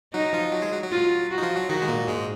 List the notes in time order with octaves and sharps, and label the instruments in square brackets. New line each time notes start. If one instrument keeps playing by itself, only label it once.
[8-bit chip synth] F#3 F#4 [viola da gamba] D#4
[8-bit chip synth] F3 F4
F#3 F#4
G#3 G#4
F#3 F#4
F#3 F#4
[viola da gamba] F4
F#4
[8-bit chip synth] D#4
F3 F4
F#3 F#4
[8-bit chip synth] D#3 D#4 [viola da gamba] F#4
[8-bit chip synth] G#3
A#2 A#3
G#2 G#3